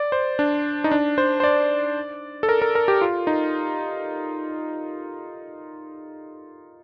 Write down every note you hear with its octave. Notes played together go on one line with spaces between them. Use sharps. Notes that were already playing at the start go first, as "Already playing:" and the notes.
Already playing: D5
C5
D4
D#4
D4
C5
C5
D5
A4
A#4
A#4
A#4
G4
F4
D#4